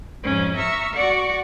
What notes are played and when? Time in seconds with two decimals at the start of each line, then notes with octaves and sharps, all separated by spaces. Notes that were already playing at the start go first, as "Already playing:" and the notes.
0.22 F2 G#2 C#4
0.56 E5 A#5 C#6 E6 F6
0.93 F#4 D5 F#5 C#6